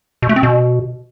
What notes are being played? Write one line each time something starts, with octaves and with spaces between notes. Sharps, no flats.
B2
A3
C4
B2